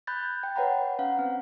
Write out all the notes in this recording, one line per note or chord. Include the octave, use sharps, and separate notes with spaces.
B5 F#6 G6 A6
G5
B4 C#5 F#5 A#5 B5
C#4 F5 F#5
C4